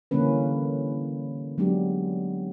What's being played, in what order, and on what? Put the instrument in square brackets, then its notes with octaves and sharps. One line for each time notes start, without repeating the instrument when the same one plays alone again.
[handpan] D3 E3 G3 A#3 C#4 B4
F#3 G#3 B3 D4 G4